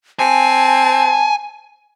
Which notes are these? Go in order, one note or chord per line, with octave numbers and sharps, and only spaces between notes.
C4 G#5 A5